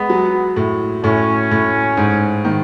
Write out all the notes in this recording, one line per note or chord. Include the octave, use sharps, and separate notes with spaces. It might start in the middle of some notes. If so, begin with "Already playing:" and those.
Already playing: G#3 B3
F#3
A2
A2 C#4
A2
G#2
D#3